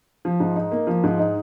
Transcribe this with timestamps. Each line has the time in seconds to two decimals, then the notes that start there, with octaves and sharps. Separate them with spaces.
0.25 F3
0.40 G#2
0.56 D#4
0.72 A#3
0.87 F3
1.04 G#2
1.19 D#4